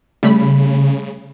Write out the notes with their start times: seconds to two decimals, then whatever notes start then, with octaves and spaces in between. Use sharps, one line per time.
0.23 C#3 G3 A3 B5